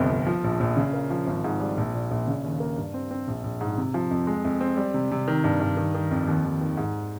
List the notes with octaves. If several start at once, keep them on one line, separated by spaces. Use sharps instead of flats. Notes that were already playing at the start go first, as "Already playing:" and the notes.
Already playing: G1 C2 F2
F2
F3
A#1
A#1
C#3
A#3
F3
G#1
G#2
G3
A#1
A#2
A#1
C#3
D#2
A#3
G2
C4
C4
A#1
A#1
G#2
C3
F3
F2
G#3
F2
C4
G3
C3
C3
D#3
G2
G2
D#3
D#3
F2
D#2
D#2
D#3
G#2